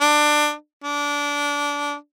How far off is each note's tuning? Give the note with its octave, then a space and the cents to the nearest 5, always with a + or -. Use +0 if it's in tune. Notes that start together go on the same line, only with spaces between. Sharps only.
D4 +20
D4 -20